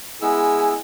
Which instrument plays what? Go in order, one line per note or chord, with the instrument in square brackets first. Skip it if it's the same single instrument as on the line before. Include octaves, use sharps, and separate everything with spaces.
[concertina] G#3 B3 E6 [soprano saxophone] E4 [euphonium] G#4 [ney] G#5